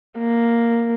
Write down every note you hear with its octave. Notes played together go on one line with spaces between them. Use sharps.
A#3